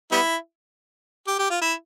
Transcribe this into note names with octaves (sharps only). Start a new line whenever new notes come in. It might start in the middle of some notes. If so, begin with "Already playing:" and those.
G3 B3 E4
G4
G4
F4
E4